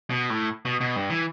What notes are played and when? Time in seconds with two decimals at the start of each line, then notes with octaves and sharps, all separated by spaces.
0.10 B2
0.30 A2
0.65 B2
0.81 B2
0.96 G2
1.10 E3